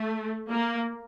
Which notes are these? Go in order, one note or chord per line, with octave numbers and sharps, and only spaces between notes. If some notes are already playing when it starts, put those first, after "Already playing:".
Already playing: A3
A#3